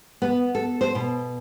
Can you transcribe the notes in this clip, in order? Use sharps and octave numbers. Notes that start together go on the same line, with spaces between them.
B3
A4
C5
B2